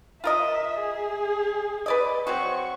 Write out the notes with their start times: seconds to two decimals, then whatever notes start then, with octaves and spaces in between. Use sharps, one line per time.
0.24 F4 A#4 D#5 E5
0.81 G#4
1.86 B4 D5 D#5
2.27 F#3 C4 F#4 C#6